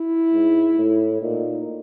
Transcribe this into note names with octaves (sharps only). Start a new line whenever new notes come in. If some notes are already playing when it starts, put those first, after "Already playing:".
Already playing: E4
G#2
A2
A#2 D#4